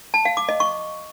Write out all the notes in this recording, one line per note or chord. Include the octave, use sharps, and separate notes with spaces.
A5
F5
D6
D#5
C#6